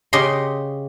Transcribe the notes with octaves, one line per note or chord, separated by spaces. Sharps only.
C#3 G4 D#5 C6